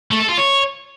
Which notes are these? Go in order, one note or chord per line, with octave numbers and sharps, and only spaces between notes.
A3
A4
F4
C#5